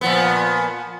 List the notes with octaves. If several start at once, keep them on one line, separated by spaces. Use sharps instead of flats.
A#2 F3 B3